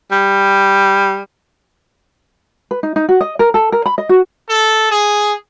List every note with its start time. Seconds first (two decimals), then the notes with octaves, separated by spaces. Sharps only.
0.12 G3
2.71 B4
2.83 D#4
2.96 D#4
3.09 F#4
3.21 D#5
3.39 A#4
3.54 A4
3.72 A#4
3.86 B5
3.98 D#5
4.09 F#4
4.49 A4
4.91 G#4